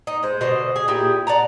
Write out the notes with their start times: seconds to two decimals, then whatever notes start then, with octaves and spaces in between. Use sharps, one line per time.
0.07 D#4
0.23 G#3 C5
0.41 B2 D3 C5 D#5
0.76 G#4
0.88 A#2 E4 G4 G#4
1.27 D5 F#5 A5 A#5